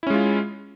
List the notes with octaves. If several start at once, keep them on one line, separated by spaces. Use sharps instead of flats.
G#3 C#4 E4 F4